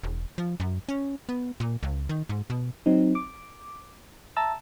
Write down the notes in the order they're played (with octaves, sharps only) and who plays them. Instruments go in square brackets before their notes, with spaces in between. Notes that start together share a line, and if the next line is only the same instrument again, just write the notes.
[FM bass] E1
F3
F#2
C#4
B3
A#2
C#2
D#3
G#2
B2
[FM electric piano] F#3 C4 D#4
D6
E5 A5 A#5 E6 A6